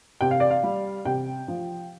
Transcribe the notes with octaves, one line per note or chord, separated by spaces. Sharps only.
C3 G5
F5
D5
F5
G3
C3 G5
F3